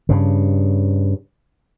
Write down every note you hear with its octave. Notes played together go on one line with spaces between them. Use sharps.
G2 C#3